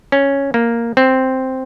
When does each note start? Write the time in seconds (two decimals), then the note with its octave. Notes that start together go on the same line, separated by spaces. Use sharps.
0.12 C#4
0.54 A#3
0.97 C4